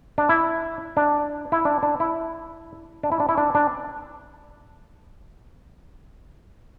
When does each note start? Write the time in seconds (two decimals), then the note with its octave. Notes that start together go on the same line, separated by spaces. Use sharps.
0.18 D4
0.29 E4
0.97 D4
1.52 E4
1.65 D4
1.83 D4
2.00 E4
3.03 D4
3.12 E4
3.20 D4
3.29 E4
3.38 D4
3.55 D4